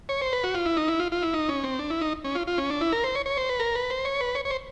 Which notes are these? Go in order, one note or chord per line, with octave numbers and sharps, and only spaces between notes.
C#5
C5
B4
F#4
F4
E4
D#4
E4
F4
F4
E4
D#4
C#4
C4
D4
E4
D#4
C#4
F4
F4
C#4
D4
E4
A#4
C5
C#5
C#5
C5
B4
A#4
B4
C5
C#5
B4
C#5
C#5
C5